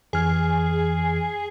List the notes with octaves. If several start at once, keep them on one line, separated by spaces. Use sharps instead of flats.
F2 E3 G#4 F6